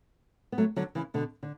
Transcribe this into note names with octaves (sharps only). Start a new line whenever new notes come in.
B3
F#3 A3
D3 F#3
C#3 E3
B2 D3
D3